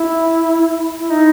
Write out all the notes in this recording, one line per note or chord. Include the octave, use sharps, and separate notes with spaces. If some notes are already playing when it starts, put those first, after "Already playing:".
Already playing: E4
E4
D#4